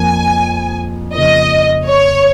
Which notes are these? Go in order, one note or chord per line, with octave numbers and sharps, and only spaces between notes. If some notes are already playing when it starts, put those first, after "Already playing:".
Already playing: F2 F3 A#3 G#5
F2 C#3 A#3 F4 A#4 D#5
C#5